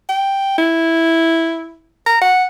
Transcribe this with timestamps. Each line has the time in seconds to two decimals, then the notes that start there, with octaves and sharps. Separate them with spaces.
0.09 G5
0.58 E4
2.06 A#5
2.21 F#5